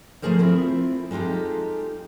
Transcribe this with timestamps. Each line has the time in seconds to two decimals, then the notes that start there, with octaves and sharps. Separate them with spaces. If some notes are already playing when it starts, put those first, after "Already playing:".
0.22 F3 G3 A3 G#4 A#4 C5
0.39 C4 E4 F4
1.11 G#3 D#4 F4 G4 A4